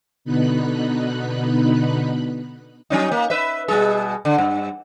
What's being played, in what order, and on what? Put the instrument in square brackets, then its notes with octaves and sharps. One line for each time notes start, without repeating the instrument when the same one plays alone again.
[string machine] B2 D3 B3 D#4 B5 F#6
[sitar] F#3 C#4 D#4
A#3
B4 E5
B2 G3 G#4
D3
G2